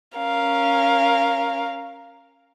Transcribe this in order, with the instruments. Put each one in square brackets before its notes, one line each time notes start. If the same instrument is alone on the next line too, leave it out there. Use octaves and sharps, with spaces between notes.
[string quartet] C#4 A#4 F5